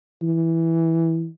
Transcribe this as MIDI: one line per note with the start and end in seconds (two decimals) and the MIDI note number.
0.22 1.28 52